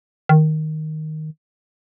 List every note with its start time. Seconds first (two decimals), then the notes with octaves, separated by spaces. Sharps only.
0.29 D#3